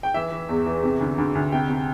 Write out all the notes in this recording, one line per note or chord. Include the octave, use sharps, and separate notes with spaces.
G5
E3 E5
E3
E2
E3
C3
D2
D2
D2
C3 G5
C3